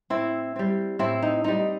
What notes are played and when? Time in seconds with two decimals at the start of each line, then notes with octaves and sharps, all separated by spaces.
0.10 A2 C4 E4
0.56 G3 C4
0.99 A2 C4 E4
1.22 D#4
1.44 G3 C4 D#4